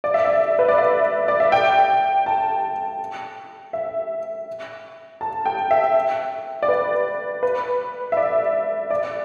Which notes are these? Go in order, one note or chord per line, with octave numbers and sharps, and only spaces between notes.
D5
E5
D5
B4
D5
E5
D5
E5
G5
A5
E5
A5
G5
E5
D5
B4
B4
E5
D5
D5